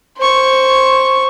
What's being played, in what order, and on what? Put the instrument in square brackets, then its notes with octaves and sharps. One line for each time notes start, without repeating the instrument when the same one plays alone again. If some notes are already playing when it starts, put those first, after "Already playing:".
[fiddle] C5 C#6